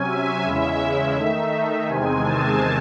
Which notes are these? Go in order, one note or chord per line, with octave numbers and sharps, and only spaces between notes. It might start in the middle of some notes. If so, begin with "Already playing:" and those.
Already playing: C3 F#3 C#4 G#5
E5
E2 C#3 G#3 C#4 E4
D#3 A3 D#4
E2 C3 D#3 G#3 C4 G#5
A5